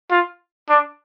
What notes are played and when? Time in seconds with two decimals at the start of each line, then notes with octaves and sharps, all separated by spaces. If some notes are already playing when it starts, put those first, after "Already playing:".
0.11 F4
0.70 D4